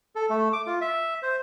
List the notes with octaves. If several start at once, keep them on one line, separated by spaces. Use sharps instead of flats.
A4
A3
D6
F4
E5
C5